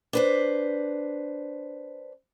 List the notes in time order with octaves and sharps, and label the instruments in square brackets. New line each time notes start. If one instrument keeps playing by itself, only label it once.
[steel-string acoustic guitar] D4 B4 C5